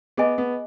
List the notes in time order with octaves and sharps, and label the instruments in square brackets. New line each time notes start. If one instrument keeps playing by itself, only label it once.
[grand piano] B3 [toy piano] G#4 D#5 G#5
[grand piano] B3